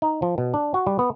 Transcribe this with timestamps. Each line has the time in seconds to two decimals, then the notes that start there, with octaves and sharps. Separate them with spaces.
0.02 D#4
0.22 F3
0.38 B2
0.54 D4
0.74 F#4
0.87 G3
0.99 B3